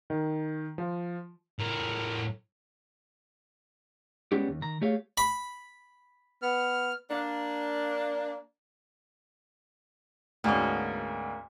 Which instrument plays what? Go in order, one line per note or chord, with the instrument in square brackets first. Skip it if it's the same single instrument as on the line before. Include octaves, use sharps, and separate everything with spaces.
[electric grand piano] D#3
F3
[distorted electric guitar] A2 A#4
[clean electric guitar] G3 G#3 B3 C#4 G4
D#2
D#3 A#5
A3 G4 G#4 C#5 F5
[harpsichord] B5
[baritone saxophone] B3 [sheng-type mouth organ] F6
[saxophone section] A#3 D4
[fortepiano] D2 G#2 B2 [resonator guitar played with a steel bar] A#3 C#4